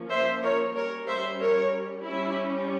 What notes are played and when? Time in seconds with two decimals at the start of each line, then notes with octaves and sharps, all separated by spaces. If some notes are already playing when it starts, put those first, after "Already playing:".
Already playing: F3 A#3 C#4
0.10 C5 E5
0.43 A#4 C#5
0.75 G3 C#4 A#4 C#5
1.08 C5 E5
1.40 A#4 C#5
2.05 G3 C#4 E4